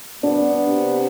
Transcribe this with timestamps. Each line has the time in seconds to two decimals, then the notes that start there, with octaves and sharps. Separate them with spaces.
0.22 B3 D4
0.63 C3